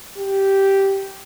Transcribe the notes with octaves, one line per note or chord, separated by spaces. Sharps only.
G4